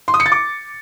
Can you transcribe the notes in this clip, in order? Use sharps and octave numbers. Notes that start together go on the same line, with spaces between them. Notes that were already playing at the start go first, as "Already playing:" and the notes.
C6
D#6
C#7
A6
D6